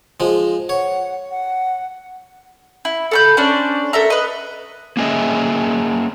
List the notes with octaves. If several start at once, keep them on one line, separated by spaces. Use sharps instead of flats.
F3 G#3
C#5 F#5
F#5
E4
A4 B5 G6
C#4 D4 C5 D5
A4 A#4 E5 A#5
B4 D#5
A#3 C#4 G#4 A4 D#5 E5